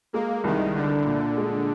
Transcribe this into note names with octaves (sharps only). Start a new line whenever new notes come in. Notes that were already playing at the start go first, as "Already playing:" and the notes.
G#3 A#3
C2 D#3
D3 D4
A#2
G#3